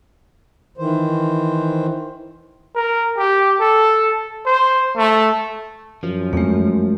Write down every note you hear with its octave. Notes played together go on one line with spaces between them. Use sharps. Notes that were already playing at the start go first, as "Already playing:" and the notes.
D#3 E3 C5
A#4
G4
A4
C5
A3
F#2 F3
F2 G#3 A3